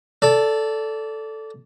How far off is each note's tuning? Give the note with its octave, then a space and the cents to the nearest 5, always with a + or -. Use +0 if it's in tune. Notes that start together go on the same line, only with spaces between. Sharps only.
A4 +0 D5 -20